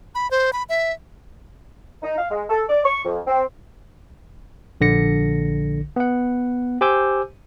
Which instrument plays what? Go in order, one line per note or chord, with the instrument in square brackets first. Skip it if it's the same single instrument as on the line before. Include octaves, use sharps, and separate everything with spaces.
[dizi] B5
C5
B5
E5
[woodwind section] D#4
F5
G#3
A4
D5
C#6
F2
C4
[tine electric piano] A#1 D3 A#6 C#7
B3 F#5
G4 C5 G#5 D6 E6 G6